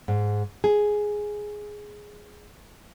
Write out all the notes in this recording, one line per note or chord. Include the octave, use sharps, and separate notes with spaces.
G#2
G#4